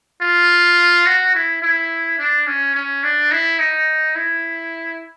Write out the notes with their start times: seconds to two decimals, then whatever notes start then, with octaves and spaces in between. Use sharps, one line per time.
0.21 F4
1.06 F#4
1.35 E4
1.62 E4
2.18 D4
2.47 C#4
2.74 C#4
3.03 D4
3.32 E4
3.59 D#4
4.15 E4